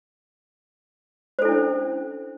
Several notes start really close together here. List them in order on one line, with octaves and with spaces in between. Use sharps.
C5 A4 E4 D4 C#4